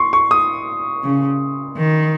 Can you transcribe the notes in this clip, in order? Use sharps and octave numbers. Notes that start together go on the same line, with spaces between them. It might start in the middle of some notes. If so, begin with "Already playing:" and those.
Already playing: C6 C#6
C#6
D#6
C#3
D#3